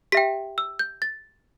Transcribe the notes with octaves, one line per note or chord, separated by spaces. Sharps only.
G4 E5 G5 B6
E6
G6
A6